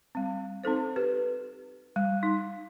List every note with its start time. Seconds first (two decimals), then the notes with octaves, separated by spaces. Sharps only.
0.15 G3 C4
0.64 C4 D#4 A4 C5
0.96 G4 B4
1.96 G3
2.23 D#4